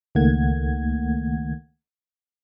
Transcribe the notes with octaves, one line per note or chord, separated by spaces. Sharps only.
C#2 D#3 A3 A#3 F#5 G#6